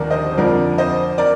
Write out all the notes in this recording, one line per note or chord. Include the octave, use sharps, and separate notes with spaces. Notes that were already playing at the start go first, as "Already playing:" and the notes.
Already playing: D#2 D3 F3 A#4 D5
C5 D#5
C5
F2 D3 F3 A#4 D5
C5 D#5
A#4 D5